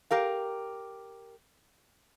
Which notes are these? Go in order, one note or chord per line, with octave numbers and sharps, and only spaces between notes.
G4 A#4 F5